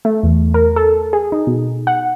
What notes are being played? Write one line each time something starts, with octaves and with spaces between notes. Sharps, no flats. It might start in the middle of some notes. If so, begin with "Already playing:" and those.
A3
E2
A#4
A4
G#4
D#4
B2
F#5